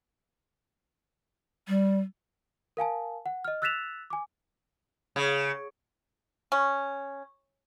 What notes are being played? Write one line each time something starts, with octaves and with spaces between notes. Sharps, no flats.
G3
A#4 F5 G#5 A5
F#5
D#5 F6
E6 F#6 A6 B6 E7 F7
G#5 D6
C#3
C#4